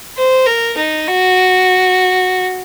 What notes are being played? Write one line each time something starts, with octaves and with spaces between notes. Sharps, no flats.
C5
A#4
D#4
F#4